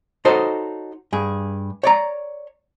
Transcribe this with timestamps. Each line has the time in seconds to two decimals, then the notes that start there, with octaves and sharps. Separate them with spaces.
0.25 D#4 F#4 A4 C5 C#5 D#5
1.13 G2 G#4
1.83 C#5 D5 A#5